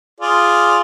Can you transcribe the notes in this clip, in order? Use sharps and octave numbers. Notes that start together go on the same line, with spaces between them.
F4 G#4 D5